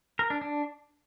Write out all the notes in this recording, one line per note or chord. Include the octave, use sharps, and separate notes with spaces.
A#4
D4
D4